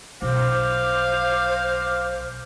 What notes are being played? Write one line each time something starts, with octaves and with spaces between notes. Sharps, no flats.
B1 C5 F5 D6